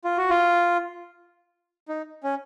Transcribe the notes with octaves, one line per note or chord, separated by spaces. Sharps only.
F4
F#4
F4
D#4
C#4